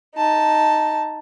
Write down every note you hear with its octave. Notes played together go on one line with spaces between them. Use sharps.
D#4 A5